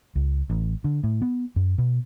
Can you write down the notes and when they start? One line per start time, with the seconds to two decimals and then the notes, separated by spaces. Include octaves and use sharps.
0.15 C#2
0.50 A1
0.84 D3
1.04 A2
1.22 B3
1.56 F#2
1.78 B2